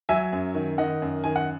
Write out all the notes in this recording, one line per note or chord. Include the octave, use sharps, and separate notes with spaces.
F#3 E5 G#5
F#2
D#3
D#3 D#5 F#5
F#2
D#3 G#5
F#5